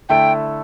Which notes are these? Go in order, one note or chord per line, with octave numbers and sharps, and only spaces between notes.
D3 A3 E4 A4 G5